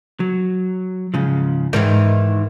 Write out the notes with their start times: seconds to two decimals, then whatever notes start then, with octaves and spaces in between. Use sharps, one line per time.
0.20 F#3
1.14 G#2 C#3 F3
1.73 G#2 D#3 E3 A#4 C5 D5